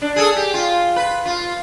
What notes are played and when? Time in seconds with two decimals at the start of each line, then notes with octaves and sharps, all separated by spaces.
0.02 D4
0.16 G#4 A4
0.36 G4
0.54 F4
0.96 B4
1.26 F4